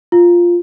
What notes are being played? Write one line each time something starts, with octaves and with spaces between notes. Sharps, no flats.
F4